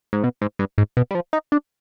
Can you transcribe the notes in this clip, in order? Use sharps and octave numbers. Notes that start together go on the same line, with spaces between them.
G#2
B2
G#2
G2
G#2
B2
G3
F3
D#4
D4